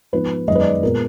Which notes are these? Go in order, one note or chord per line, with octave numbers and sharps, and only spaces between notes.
G#2 F3 B3 B4
F#2 D#3 G#3 B3 D#5
B4
D5
A#2 G#3 B3 A#4